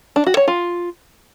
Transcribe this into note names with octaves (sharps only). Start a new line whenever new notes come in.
D4
F#4
C#5
F4